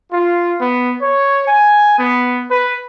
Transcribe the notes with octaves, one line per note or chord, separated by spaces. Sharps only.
F4
B3
C#5
G#5
B3
B4